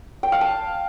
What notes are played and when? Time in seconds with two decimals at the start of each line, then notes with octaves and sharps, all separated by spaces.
0.23 G5
0.32 F5
0.41 A5